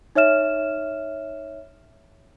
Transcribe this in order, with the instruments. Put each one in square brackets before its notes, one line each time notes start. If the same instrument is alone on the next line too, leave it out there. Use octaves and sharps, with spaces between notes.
[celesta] D#4 C#5 E5 F6 E7